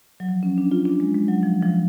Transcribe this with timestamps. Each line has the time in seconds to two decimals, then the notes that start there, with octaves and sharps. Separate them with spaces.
0.20 F#3
0.29 F3
0.43 C#4
0.58 D4
0.72 F4
0.85 D4
1.00 G#3
1.15 G#3
1.28 F#3
1.43 F3
1.62 F3